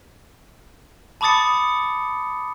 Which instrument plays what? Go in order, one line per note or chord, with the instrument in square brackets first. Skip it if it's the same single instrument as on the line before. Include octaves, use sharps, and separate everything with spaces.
[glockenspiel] A5 B5 D6 D#6 A6 C#7